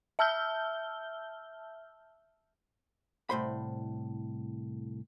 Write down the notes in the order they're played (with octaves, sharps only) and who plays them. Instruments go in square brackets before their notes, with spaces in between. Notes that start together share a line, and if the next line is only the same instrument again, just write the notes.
[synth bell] E5 A5 E6 F6 G6 G7
[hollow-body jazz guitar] C2 A2 C5 B5